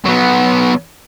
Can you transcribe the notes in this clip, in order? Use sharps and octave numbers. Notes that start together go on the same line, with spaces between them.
F#3 B3